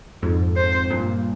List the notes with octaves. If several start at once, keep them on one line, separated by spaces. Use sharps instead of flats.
F2 G#2
C5
G2 A#2